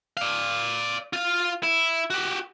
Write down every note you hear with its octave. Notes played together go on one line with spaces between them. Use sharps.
D5 F5
F4 F5
E4
F#4 G4